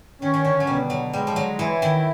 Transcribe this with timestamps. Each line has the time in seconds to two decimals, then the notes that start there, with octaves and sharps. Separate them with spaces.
0.21 D#3 C#4
0.34 D#3
0.45 D3
0.60 F#3
0.67 B2 G3
0.90 F#3
1.13 G3 G#3
1.27 F3
1.36 F#3
1.59 E3 E4
1.82 D#3